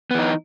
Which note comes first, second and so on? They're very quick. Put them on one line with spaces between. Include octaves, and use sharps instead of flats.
B3 E3 D#4